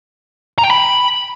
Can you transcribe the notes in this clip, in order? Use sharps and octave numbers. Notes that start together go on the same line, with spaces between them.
A#5
G5
B5